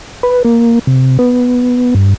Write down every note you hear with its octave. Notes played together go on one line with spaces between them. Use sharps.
B4
A#3
C3
B3
G2